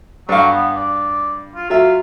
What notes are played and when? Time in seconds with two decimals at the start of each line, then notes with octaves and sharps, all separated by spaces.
0.29 G2 F#3 F5
0.50 B3
0.76 D5
1.55 F4
1.70 F#3 F4 E5